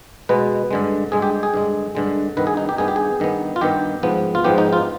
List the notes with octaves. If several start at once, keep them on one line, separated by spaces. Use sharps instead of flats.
B2 G#3 B3 B4
G2 D3 G#3
G2 D3 G#3 G#4
G4
G#4
G2 D3 G#3
G2 D3 G#3
G2 D#3 B3 B4
G#4
D#4
G4
G2 D#3 B3 G#4
G4
G#4
G2 D#3 B3
F4
G2 D#3 B3 G4
G#2 F3 B3
F4
G#2 F3 B3 G4
D#4
F4